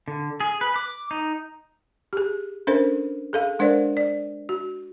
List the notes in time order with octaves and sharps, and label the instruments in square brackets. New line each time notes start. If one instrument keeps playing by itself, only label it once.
[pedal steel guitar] D3
G#4
B4
D6
D#4
[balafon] G4 G#4
C#4 D4 A4 A#4 C5
G#4 A4 F5
G#3 D4 A#4 C5 D5
D5
F#4